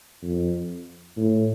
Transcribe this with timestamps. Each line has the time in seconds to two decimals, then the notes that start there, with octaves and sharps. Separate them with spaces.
0.22 F2
1.17 A2